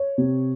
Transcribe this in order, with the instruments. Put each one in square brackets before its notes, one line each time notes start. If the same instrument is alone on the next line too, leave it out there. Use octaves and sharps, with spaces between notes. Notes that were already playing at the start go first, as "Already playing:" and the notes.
Already playing: [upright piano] C#5
C3